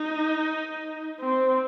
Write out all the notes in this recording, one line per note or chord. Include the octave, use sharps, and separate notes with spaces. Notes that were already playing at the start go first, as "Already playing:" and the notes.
Already playing: D#4
C4